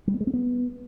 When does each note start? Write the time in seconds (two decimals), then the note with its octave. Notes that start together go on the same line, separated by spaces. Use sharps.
0.07 G3
0.14 B3
0.20 G#3
0.27 C4
0.34 B3